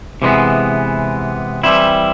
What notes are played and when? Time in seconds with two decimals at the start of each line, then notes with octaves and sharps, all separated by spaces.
0.22 C3 E3 G#3 B3
1.64 E3 G3 C4 E4